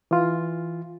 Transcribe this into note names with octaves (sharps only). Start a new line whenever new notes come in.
E3 F4